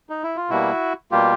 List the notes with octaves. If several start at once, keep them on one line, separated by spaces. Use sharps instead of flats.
D#4
E4
F4
B2 G3 A#3 E4 F#4
B2 G3 A#3 F4 G4